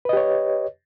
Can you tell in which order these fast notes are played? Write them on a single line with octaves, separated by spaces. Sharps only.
B4 D#5 G4 C#5